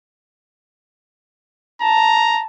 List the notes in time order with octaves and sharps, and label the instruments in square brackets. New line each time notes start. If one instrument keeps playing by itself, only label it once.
[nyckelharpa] A5 [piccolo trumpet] A#5